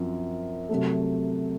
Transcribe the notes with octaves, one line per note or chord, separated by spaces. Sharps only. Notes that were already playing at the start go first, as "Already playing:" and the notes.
Already playing: F#2 F3 C4
C3 F#3 A3